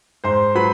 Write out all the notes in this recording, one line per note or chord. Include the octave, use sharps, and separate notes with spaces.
G#2 C5 C6
F#3 B4 B5